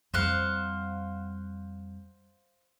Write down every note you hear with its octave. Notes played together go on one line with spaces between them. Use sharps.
F2 G3 C5 F5 F#5